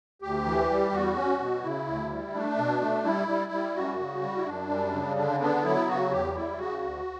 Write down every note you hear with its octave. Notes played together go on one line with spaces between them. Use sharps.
D2 G4
E3
G3
E2 F#4
C#4
B2
C#3 E4
D2
G3
A3 D4
B2
A3
G3 E4
G3
G3
F#2 F#4
C#3
G3
E4
F#2 D4
G3
C#3
D3 D4
B3 D4
F#3 E4
C#3 F#4
E2 G4
G3 E4
C#3 F#4
D2